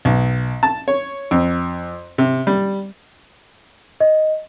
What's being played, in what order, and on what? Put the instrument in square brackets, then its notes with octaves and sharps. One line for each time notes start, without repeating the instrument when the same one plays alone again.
[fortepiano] B1
A5
C#5
F2
C3
G3
[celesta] D#5